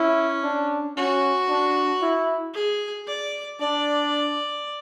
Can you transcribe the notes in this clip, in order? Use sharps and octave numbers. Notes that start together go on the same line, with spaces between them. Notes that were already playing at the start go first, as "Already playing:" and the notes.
Already playing: C#4 E4
D4
C#4 F#4
D4
E4
G#4
D5
D4 D5